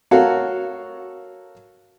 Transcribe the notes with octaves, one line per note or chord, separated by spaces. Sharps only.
F#4 A4 A#4 C#5 F5